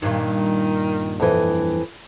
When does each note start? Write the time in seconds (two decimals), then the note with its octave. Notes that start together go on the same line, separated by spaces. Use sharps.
0.02 G2 A#2 D#3
1.20 F2 E3